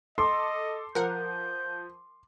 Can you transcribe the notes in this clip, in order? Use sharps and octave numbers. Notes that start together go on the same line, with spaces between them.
A4 D#5 C6 D6
F3 A#4 F#5 G6